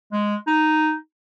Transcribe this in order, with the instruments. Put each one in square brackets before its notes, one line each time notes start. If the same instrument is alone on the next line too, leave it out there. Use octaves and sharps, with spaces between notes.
[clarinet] G#3
D#4